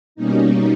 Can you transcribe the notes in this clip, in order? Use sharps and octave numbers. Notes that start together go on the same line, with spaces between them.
B2 G3 A#3 C#4 D#4